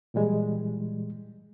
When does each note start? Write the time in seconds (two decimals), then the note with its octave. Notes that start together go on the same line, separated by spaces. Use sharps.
0.14 A#2 E3 G3 G#3